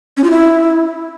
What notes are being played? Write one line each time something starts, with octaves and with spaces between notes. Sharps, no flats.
C#4
F4
E4